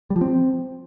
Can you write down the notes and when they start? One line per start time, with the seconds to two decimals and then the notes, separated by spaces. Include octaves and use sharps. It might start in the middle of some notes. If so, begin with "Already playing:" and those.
0.10 G3
0.16 F3
0.21 C4